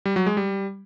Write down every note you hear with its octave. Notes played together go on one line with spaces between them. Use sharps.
G3
F#3
G#3
G3